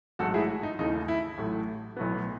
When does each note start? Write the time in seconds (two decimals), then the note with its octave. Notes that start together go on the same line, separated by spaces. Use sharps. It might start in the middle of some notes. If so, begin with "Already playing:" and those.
0.19 A1 G#2 F#3 A3 F#4 A4
0.34 E4 G#4
0.63 D#4
0.79 D#2 C#3 E3 A3 D#4
1.08 E4
1.38 A1 A2 F#3 A3
1.97 B1 A2 F#3 B3